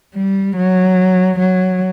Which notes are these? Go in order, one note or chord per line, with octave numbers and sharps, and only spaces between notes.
G3
F#3
F#3